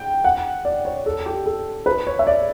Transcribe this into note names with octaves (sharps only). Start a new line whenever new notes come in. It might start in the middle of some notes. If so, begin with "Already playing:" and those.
Already playing: G5
F#5
D5
C#5
A4
G4
A4
B4
C#5
E5
D5